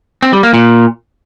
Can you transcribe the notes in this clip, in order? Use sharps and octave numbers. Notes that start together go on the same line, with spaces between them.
C4
G3
A#3
A#2